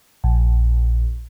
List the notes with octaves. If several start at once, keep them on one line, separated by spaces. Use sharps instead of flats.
A#1